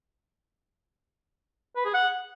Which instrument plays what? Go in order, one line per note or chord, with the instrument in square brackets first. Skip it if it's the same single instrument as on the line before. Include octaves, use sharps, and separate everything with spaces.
[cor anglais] B4
G#4
F#5